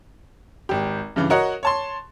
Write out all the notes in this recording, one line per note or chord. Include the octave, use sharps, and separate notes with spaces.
G#1 G4
G2 C#3 E3
F#4 A#4 C#5 D#5 F#5
C#5 A5 C6